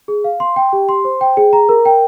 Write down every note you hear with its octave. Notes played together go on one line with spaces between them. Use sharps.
G#4
F5
C6
G5
G4
C6
C5
G5
G#4
A#5
A#4
G5